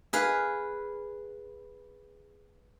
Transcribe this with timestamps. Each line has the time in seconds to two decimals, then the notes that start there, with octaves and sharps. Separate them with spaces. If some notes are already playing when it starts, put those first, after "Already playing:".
0.13 G#4 B4 F5